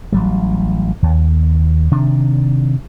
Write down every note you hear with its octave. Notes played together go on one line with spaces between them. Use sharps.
A1 F#3 G3
D#2
C3 D#3 D4